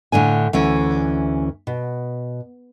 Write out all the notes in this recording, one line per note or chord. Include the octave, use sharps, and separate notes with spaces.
A2 D3 D4 G#5
D2 E3 C#4
B2